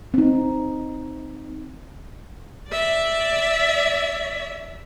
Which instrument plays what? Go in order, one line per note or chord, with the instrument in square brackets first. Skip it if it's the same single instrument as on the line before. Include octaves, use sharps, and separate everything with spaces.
[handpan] C4 D#4
[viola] D5 E5